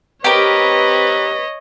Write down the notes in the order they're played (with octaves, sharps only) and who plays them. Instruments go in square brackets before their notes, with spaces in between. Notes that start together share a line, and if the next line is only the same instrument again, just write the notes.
[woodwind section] C4 B4 [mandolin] G4 A#4 [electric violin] C#5 D#5